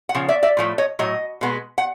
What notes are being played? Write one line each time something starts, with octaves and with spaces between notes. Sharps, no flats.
F#5
C#3 F3
D5 E5
D5 E5
A2 F3 A3
C#5 D#5
A2 F#3 D#5
B2 G#3 B3
F#5